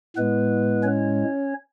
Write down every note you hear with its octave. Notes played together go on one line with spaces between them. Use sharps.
A2 G#3 B3 B4
C#4 C#5